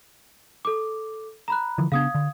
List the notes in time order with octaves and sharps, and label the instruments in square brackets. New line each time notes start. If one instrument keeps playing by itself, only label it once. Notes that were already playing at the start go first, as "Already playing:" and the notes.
[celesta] A4 D6
A#5 B5 F#6
[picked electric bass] D3 E3 F3
[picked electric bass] C#3 B3 D4 [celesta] F5 D#6 G#6
[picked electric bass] D3